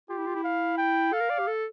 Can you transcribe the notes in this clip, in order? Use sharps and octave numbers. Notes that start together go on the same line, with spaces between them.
F4 G4
E4
F4
E4
F5
G5
A4 F5
A#4
D5
G4
A4